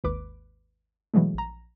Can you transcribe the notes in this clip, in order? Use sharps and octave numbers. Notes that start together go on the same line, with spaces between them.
G#1 D#2 B4 D6
B2 E3 F#3 G#3 A3
A#1 A#5